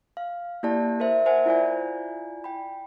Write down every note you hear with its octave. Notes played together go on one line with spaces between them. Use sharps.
F5
A#3 E4 G4 D5 A5
A#4 C5 E5
A#4 C5 E5 F#5 G#5
E4 F4 D5 G#5
G5 B5